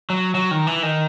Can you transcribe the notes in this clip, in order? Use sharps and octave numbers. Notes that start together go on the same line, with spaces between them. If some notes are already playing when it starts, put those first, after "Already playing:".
F#3
F#3
D#3
E3
D#3